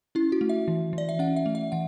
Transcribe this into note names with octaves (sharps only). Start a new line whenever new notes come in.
C#4 E4
F#4
A3
E5
E3
E3
D5
E5
C#4 F#5
E5
A3
E5
E3 F#5